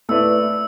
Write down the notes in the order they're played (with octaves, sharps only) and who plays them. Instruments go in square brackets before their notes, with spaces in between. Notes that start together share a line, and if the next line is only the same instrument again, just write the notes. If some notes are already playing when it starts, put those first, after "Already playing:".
[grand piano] A3 E4 B4 D5 [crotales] E6